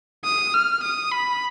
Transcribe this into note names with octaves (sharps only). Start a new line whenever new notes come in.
D#6
F6
D#6
B5